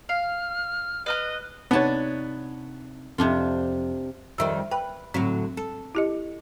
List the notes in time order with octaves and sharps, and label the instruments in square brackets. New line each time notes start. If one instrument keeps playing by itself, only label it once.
[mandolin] F5 [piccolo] F6
[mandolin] B4 F6 F#6 [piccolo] D#5
[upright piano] C3 D#4 [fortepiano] B3 C#5 [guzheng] D4 A5
[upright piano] F2 [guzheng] C3 D4 F4
[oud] F2 D#3 G3 [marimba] E5 E6
[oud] B4 [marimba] G5
[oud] A2 D3 F#3 [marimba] C4
[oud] A4
[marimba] E4 G4 D#5